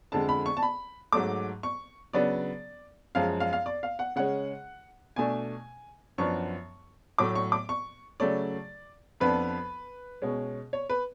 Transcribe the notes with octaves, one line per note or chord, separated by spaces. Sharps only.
F2 D3 G#3 A5
B5
C#6
A5
B5
G#2 F#3 A3 D6
C#6
C#3 F#3 B3 D4 D5
F#2 F3 G#3 F5
F5
F5
D5
F5
F#5
C#3 G#3 C#4 F#5
B2 A3 D4 G#5
F#2 F3 B3 D4 C#6
A2 F#3 A3 D6
C#6
D6
C#6
C#3 F#3 A3 C#4 D5
F2 F3 B3 D4 B4
B2 G#3 C#4
C#5
B4